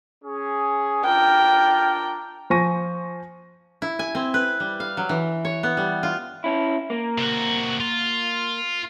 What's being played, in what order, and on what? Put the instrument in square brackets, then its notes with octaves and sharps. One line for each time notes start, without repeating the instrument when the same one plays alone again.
[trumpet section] C#4 G#4
[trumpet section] D4 F4 A#4 [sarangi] G5
[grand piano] F3 C5 G#5 C#6 A#6 D#7
[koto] E4
G#5
C4
B4
G3
F5
F#3
E3
C#5
B3
G3
F4
[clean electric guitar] C#4 E4
A#3
[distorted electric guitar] C3 F#4
F4